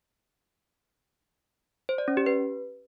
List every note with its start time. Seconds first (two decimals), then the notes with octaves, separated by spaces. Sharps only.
1.89 C5
1.98 D5
2.08 C#4
2.17 G4
2.26 B4